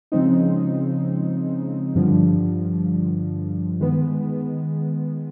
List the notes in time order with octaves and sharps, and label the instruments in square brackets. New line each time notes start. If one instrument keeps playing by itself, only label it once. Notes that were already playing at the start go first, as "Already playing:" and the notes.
[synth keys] C#3 F3 G#3 C4 D#4
G2 D3 F3
D#3 G#3 B3